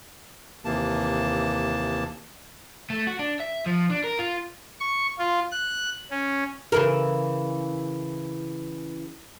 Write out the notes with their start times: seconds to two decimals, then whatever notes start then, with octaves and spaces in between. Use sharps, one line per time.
0.65 D#2 C3 E3 A#3 A5
2.90 A3
3.07 F#4
3.19 D4
3.40 E5
3.67 F3
3.90 D4
4.04 A#4
4.19 F4
4.80 C#6
5.19 F4
5.51 F#6
6.11 C#4
6.72 C#3 E3 A#4